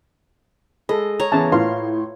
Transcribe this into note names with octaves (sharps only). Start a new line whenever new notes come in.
G#3 A4 D#5 B5
C#5 A#5
C#3 E3 B3 A5
A2 F4 B4 F5 C6